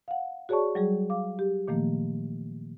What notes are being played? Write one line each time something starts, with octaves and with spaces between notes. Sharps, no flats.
F5 F#5
F#4 G#4 C#5 D5 A5 C#6
F#3 G3 G#4
F5 D6
G4
A#2 D#3 F3 A3 A#3